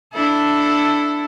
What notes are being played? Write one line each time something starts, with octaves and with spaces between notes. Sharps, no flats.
D4 E4 A4